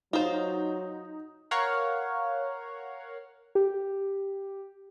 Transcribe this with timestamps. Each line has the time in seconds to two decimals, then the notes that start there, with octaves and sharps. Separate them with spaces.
0.13 F#3 D#4 F4 C5
1.51 A#4 C#5 F5 F#5
3.55 G4